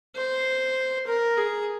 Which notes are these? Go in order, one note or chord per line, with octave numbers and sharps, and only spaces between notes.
C5
A#4
G#4